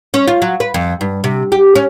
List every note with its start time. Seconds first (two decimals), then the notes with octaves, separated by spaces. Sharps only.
0.14 C#4
0.28 F4
0.42 F#3
0.60 B4
0.74 F2
1.01 G2
1.24 C3
1.52 G4
1.75 C#4